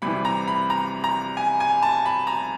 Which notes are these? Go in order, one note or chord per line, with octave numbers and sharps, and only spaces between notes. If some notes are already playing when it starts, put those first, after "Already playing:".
C2 C3 E3 B5
A#5
B5
A#5
A#5
G#5
G#5
A5
B5
A#5